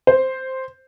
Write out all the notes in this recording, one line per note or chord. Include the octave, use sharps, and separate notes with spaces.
C5